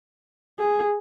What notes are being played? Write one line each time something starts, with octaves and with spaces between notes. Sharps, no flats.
G#4